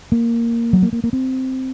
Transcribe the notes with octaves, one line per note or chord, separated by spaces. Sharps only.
A#3
F#3
A#3
A#3
A#3
C4